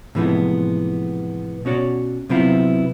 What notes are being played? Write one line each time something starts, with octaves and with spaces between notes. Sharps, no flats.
A2 C3 E3 F3 G#3 B3
B2 C#4 F#4 C#5 D5
C3 F#3 B3 C4 E4 F4